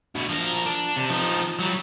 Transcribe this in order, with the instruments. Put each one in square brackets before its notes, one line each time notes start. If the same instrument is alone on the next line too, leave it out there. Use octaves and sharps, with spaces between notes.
[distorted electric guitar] D2 B2
F3 A#4
D4
C3
F3 D#4
F#3 G3